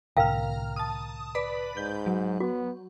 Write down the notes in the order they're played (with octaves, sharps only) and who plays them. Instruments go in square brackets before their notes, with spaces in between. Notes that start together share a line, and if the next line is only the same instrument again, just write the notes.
[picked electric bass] C2 A2 D3 [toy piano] A#4 F5 G5 [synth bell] A#5 F6
[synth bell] A5 D#6
B4 D5 B5
[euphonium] G#2 [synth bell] G6
[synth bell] F#3
[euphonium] B3 [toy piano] F#4